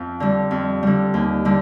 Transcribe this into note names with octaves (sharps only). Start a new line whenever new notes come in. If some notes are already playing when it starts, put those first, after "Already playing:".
Already playing: F2
D3 G3
F2
D3 G3
D#2
D3 G3